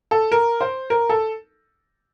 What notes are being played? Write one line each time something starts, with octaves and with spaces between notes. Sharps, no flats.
A4
A#4
C5
A#4
A4